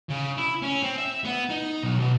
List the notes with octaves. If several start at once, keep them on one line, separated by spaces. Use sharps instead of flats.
C#3
E4
C#4
C4
E5
B3
D#4
B1
B2